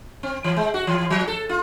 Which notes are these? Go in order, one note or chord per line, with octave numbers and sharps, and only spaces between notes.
C4
E3
G#3
F#4
E3
F3
A4
F4